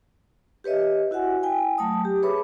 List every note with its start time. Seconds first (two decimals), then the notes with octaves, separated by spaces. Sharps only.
0.64 G4 B4 C#5 D#5 E5
1.11 E4 F#4 E5 F#5 G#5
1.43 E4 G5 G#5
1.78 F#3 A3 A5 D#6
2.05 G4
2.23 G#4 B4 C#5 E5 B5 D6